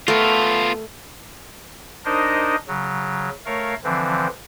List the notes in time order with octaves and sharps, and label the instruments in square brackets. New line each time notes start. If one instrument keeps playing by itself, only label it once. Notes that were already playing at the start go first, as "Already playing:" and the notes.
[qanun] A3 A#4 [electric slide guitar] B3 F4
[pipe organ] D4 D#4 A#4 C5 D#5
C#3 F#3
A3 A#4 C#5 F5
D3 E3 F3 C4